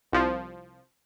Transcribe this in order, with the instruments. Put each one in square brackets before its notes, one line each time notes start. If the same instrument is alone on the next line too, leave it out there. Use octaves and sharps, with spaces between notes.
[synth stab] C2 F3